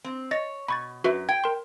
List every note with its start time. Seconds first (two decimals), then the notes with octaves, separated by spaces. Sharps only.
0.04 C4
0.31 C#5 D#5 A6 A#6
0.68 B2 B5 C#6 A6
1.04 F#2 F#4 B4 E5
1.29 G5 G#6
1.44 A#4 C6